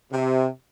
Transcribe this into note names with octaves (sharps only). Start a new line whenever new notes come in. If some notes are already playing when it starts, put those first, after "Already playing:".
C3